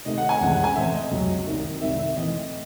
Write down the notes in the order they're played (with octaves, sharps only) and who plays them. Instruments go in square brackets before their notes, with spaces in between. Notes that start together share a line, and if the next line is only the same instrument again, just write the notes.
[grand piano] C3 D#3 A3 D#5
F#5
G#5
C#2 C3 E3 G#3 C#4 F#5
F#5
G#5
A2 E3 C4 E5
D#5
C#2 C3 F#3 C#4
C2 C3 D#3
C2 C3 D#3 E5
E5
A2 E3 C4 D#5